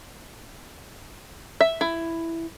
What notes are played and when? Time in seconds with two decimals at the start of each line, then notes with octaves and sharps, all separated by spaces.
1.61 E5
1.81 E4